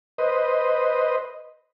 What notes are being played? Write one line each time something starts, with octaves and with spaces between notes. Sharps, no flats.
B4 C5 D#5